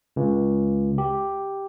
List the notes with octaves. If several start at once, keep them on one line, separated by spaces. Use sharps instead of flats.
C#2
G4